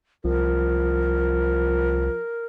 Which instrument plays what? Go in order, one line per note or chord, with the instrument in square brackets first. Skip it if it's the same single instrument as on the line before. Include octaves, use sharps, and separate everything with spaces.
[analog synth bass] C2 [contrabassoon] F3 [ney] A#4